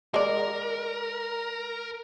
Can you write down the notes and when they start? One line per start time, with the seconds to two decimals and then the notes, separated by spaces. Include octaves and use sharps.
0.14 G#3 A#4 D5